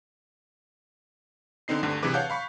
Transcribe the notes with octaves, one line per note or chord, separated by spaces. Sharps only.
D3 B3 C4 D#4 C7
D2 G2 D3
C3 E3 D4 G#4 B4 D6
C#5 F5 F#5 A5 F#6 G6
F5 B5 C#6